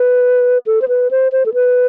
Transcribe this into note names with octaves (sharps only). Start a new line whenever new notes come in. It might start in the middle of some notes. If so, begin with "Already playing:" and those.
Already playing: B4
A4
C5
B4
C5
C5
A4
B4